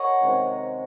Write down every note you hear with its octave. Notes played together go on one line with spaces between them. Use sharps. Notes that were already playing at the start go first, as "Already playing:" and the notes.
Already playing: A#4 C#5 D#5 F#5
C3 D#3 G#3 C#4